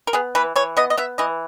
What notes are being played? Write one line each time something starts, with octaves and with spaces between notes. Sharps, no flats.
A#4
B3 G#4
E3 B4
E3 C#5
B3 D#5
D#5
B3 E5
E3 D#5